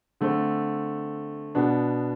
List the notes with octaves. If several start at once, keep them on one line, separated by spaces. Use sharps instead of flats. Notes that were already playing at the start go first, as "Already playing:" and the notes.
D3 A3 C4
B2 B3 D4